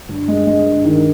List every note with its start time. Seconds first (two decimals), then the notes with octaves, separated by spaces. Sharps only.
0.09 G2
0.28 G#3
0.47 G#3
0.66 G2
0.85 D#3